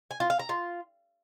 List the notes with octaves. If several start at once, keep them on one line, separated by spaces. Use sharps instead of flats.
G#5
F4
F5
A#5
F4